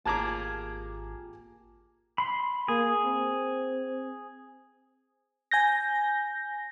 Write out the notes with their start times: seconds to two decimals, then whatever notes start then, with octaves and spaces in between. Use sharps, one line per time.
0.06 G#1 A#3 F4 G4 G#4 A5 A#5 D6
2.18 B5 C6
2.68 A#3 G#4
3.05 C4
5.51 G#5 G6 A#6